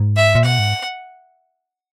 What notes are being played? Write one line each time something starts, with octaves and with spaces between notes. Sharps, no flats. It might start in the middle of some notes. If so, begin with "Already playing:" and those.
Already playing: G#2
E5
A#2
B2 F#5
G#2